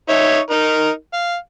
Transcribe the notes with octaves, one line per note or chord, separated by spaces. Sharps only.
D#4 C#5 E5
D#4 A#4
F5